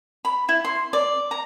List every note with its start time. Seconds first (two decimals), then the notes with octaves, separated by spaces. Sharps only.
0.25 B5
0.49 E4
0.65 C6
0.93 D5
1.31 A#5